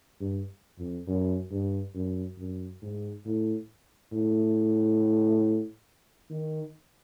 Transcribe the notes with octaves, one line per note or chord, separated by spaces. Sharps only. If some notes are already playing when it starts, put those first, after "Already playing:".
G2
F2
F#2
G2
F#2
F#2
G#2
A2
A2
D#3